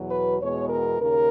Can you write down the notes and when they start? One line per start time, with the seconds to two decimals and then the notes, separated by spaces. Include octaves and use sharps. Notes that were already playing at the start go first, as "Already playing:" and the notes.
Already playing: E2 B2 F#3
0.10 B4
0.40 E2 B2 G#3 B3 C#5
0.70 A#4
1.00 D#2 C#3 A#4